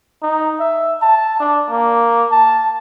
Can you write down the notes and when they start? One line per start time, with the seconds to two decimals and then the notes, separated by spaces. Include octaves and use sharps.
0.23 D#4
0.60 E5
1.02 A5
1.40 D4
1.70 A#3
2.31 A5